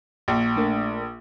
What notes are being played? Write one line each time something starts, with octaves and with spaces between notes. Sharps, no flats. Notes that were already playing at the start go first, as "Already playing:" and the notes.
A#1
A3 D4 A#4